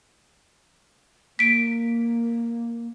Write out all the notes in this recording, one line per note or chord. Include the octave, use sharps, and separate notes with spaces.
A#3 B6 D7